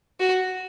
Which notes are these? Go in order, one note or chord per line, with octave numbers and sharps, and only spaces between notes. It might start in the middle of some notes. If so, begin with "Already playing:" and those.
F#4